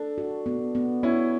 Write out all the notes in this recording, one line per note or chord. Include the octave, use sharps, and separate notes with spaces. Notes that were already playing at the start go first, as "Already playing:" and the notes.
Already playing: D4 A4
F#4
B3
B3
B3 C#4 E4